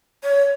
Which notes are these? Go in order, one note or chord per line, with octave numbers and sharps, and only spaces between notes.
C#5